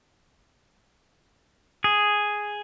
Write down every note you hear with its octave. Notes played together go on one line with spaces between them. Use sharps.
G#4